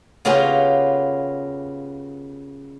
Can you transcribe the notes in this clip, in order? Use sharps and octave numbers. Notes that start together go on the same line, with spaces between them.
C#3 A#3 B3 C#4 F4 G4